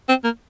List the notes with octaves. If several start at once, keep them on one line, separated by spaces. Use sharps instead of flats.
C4
A#3